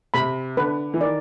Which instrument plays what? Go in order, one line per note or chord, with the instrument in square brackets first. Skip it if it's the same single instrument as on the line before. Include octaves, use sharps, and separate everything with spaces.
[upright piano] C3 [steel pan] B5
[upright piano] D3 [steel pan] B4
[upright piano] E3
[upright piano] D#3 [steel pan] D5